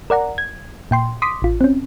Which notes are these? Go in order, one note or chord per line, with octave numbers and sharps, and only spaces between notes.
A#4 D5 F#5 A#5
G#6
A#2 G5 C6
C6 D6 D#6 B6
A1 F4
C4 C#4